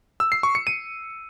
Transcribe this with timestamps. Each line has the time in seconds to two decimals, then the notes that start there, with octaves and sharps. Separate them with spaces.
0.20 E6
0.32 C7
0.43 C#6
0.55 C#7
0.67 D#7